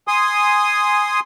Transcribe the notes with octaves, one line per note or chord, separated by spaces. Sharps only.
G#5 C6 D#6